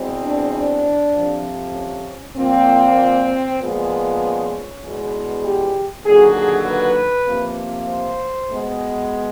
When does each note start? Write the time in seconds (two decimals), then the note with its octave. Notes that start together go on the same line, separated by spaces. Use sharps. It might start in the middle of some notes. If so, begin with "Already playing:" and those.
Already playing: E2 B2 G#3 C4
0.23 D4
0.54 D4
1.14 F2 C3 F3
1.75 C#4
2.37 A#2 F3 A#3 C4
3.60 A#2 F3 G#3 B3
4.22 C#4
4.82 E2 B2 G#3
5.44 G4
6.05 D#2 D3 F#3 G#4
6.36 G#4
6.66 B4
7.28 C3 F3 A#3
7.89 C5
8.50 B2 G#3 B3